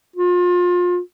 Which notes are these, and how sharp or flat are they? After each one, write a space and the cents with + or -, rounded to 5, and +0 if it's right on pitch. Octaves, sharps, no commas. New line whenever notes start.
F4 +30